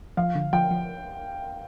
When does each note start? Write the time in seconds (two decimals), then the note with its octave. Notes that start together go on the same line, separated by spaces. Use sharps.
0.17 F3 F5
0.35 D3
0.53 F3 G5
0.71 F3